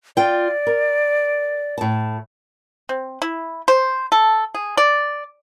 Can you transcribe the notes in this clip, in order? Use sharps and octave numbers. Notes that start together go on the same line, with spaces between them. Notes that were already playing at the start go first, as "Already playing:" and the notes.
F4 D5 G5
A#4
A2 A5
C4
E4
C5
A4
G#4
D5